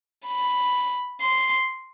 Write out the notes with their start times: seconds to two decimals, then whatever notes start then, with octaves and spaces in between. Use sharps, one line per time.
0.27 B5
1.21 C6